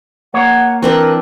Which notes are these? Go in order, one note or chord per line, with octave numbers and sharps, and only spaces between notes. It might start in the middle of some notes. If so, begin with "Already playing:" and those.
A#3 C#5 F#5
E3 C4 D4 A#4 B4